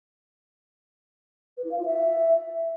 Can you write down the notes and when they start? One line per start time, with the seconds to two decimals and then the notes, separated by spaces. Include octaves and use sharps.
1.57 B4
1.64 E4
1.71 F5
1.78 F4
1.85 E5